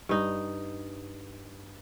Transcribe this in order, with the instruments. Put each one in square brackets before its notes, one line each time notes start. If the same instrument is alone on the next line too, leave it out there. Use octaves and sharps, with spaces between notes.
[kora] G2 D#4